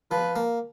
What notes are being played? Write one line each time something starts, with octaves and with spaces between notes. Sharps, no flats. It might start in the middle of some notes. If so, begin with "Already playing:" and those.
F3 B4
A#3